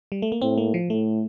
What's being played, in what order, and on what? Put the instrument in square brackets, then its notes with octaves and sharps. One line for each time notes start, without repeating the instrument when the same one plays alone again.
[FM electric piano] G3
A3
A#3
[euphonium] A2 [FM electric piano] C4
[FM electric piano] A#3
F3
[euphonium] A2 [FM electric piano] A3